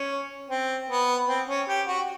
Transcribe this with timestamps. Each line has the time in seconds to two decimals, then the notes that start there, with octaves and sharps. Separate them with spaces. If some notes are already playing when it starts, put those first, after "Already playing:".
Already playing: C#4
0.50 C4
0.90 B3
1.28 C4
1.49 C#4
1.68 G4
1.88 F#4